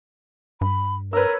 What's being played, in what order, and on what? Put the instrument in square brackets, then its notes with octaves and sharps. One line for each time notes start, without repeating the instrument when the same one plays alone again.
[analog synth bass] G2 [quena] B5
[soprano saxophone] A#4 [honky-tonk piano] B4 E6 [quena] C#5